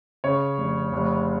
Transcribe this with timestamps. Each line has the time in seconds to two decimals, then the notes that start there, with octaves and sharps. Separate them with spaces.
0.24 C#3 C#5
0.58 F1
0.93 F1